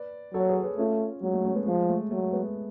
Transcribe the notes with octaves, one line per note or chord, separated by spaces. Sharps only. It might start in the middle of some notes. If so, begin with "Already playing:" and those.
Already playing: B4 D5
F#3 A4 C#5
G#4 B4
G#4 B4
A3 C#4 F4
F#3 G#3
A3
A3 C#4
G#3 B3
F3 G#3
A3
F#3 A3
G#3 B3